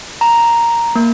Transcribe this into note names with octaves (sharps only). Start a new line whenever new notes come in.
A#5
A#3